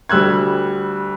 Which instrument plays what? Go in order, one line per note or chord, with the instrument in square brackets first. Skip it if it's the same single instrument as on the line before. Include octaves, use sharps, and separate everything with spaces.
[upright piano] D2 G3 E6 F#6 G#6